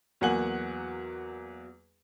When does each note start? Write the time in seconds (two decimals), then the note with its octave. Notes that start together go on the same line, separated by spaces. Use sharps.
0.21 E2 F#3 A#3 F#5 G#5 F#7